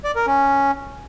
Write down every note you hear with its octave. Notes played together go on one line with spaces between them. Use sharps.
D5
A#4
C#4